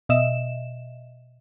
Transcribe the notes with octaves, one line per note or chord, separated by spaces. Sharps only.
B2 D#5 E5 E7